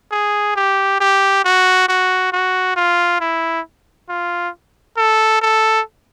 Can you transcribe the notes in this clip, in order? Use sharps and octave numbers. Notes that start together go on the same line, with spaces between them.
G#4
G4
G4
F#4
F#4
F#4
F4
E4
F4
A4
A4